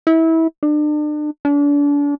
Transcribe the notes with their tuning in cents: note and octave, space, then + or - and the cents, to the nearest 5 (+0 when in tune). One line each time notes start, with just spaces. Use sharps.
E4 -25
D4 +35
D4 -35